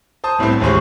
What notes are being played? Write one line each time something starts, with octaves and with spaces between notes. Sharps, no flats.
C5 A5 D#6
C2 A2 B3 C4
D#1 A1 G#3 C5 C#6